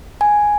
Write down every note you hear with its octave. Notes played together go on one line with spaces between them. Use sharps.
G#5